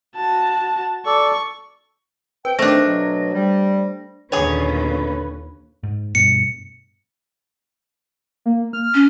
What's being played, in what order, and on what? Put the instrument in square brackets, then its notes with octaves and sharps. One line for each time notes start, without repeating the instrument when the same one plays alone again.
[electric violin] F#4 A5
[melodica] A4 D5 [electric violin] C#6
[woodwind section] C4 G5 [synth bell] B4
[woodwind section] D#3 C4 [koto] A3 D4 [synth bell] C5 A#6
[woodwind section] B2 F#3
G3
[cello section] D#2 A#2 C#4 [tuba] D3 [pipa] G#4 C#5 [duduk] B4
[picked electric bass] G#2
[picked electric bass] G2 B2 [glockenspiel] C#7
[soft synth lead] A#3
F6
[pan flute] C#4